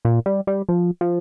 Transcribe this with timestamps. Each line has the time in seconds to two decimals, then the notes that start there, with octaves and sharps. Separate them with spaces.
0.05 A#2
0.26 G3
0.47 G3
0.69 F3
1.01 F3